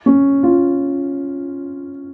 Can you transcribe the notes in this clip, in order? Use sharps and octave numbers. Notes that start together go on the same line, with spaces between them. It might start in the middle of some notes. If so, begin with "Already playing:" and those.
C#4
F4